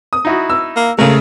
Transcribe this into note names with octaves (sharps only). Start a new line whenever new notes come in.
D#6
D#4 E4 F#4
E6
A#3
C#3 G#3 A3 A#4